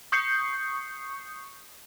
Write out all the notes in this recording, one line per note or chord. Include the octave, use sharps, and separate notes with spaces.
C#6 D#6 G6 C7 C#7